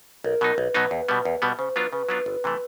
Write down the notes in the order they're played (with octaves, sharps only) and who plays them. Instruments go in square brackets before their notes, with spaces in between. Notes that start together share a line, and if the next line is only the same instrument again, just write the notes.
[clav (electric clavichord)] B1 [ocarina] A#4
[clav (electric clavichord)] B2 F#3 B3 D#4
[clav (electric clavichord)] B1 [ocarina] B4
[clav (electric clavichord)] B2 F#3 B3 D#4
E2
B2 G3 B3
E2
B2 G3 B3
[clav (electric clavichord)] C#3 [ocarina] C5
[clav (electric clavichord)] F#3 B3 D4 F4 [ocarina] B4
[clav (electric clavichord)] C#3 [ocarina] B4
[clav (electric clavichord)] F#3 B3 D4 F4
G1
C3 E3 A3